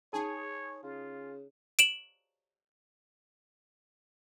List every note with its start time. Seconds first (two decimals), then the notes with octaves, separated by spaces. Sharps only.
0.13 D#4 G#4 C#5 A5
0.83 C#3 F4
1.79 D7 E7 F#7